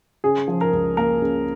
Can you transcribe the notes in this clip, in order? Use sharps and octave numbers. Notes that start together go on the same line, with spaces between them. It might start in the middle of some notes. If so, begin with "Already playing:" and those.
C#3 G#4
F3
A#4
C#2
A#3 A#4
C#3